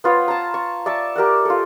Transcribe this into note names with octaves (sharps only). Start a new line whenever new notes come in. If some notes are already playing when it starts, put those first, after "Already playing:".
B3 F4 C5 C#5
A5 A#5
C#6
D5 E5 A5 C#6
G4 A#4 D5 F#5
F4 A4